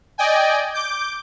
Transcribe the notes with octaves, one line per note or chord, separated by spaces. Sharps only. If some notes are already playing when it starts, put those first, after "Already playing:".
D5 D#5 G5 G#5
D6 G6